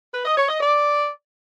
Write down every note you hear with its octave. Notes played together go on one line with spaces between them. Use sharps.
B4
D#5
C#5
D#5
D5